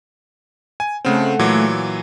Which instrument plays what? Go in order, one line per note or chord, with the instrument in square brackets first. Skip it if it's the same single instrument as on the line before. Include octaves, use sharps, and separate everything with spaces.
[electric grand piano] G#5
[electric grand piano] C#3 C4 [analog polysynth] A3 F#5
[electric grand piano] A#2 E3 F#3